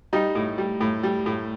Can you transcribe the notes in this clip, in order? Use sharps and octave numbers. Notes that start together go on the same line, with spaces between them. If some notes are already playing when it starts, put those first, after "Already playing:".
G3 D#4
A2
G3
A2
G3
A2